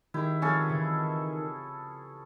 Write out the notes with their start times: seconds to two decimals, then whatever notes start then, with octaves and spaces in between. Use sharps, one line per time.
0.14 D#3 E4 G4 G#4
0.42 F3 C4 C#4 G#4 A4
0.69 C#3 E3